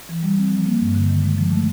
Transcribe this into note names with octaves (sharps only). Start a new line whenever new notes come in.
E3
G3
C4
F3
A#3
G2
D3
D#3
G#3
F3
A3